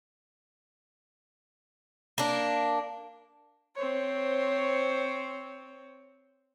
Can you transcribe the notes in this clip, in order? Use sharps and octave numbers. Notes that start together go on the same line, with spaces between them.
A#3 D4
C4 C5 C#5